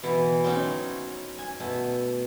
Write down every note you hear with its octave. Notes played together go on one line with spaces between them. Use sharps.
B2 E3
F#3 C4 C#4 D#4
G#5
B2 A3